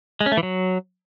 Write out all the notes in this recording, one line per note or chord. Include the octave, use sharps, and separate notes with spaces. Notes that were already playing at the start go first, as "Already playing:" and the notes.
G#3
C#4
A3
E3
F#3